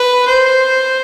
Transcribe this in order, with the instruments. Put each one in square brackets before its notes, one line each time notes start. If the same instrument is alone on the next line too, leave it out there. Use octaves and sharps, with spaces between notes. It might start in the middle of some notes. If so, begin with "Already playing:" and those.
Already playing: [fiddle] B4
C5